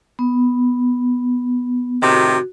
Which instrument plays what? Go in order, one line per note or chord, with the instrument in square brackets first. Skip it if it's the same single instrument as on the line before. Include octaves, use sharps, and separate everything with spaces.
[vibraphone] B3
[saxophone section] A2 C3 D#3 [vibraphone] F#4